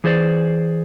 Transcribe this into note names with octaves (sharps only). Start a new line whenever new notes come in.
E3 G#4 C5 D5